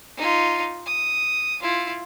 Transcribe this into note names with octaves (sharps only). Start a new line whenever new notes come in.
D#4 F4
D#6
E4 F4